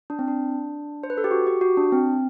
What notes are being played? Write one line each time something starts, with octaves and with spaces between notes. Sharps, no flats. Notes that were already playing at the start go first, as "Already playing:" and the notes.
D4
C4
D4
C5
B4
A4
G4
F#4
G4
F#4
D4
C4